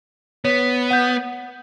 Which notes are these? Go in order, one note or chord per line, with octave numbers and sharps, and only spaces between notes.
B3 C#5
F#5 G6